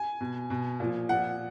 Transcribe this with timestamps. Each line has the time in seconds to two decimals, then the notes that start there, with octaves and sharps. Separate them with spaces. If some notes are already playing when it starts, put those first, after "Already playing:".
Already playing: G#5
0.21 B2
0.50 B2
0.80 A#2 F3
1.09 A#2 F3 F#5